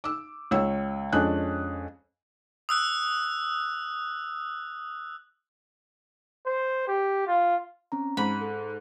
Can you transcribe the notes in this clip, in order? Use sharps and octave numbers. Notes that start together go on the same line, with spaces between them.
D6 E6
C#2 C#5 E6
F2 G#3 C#4 D4 F#6
D#6 E6 F#6
C5
G4
F4
C4 C#4 A#5
G#2 B5
A4